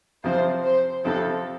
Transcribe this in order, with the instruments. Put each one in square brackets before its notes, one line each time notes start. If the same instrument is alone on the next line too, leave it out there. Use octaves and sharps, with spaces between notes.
[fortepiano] F2 C3 F3 C4 [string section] C5
[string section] C5
[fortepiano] F2 C3 F3 C4 [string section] A4